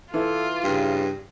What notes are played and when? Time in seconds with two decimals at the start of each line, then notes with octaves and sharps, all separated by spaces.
0.14 E3 F4 A4
0.63 G2 C#3